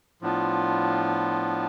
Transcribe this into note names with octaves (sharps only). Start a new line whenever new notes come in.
A2 F3 B3 D4 F4